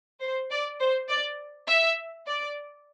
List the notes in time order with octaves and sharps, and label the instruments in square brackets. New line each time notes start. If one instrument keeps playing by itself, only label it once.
[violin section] C5
D5
C5
D5
E5
D5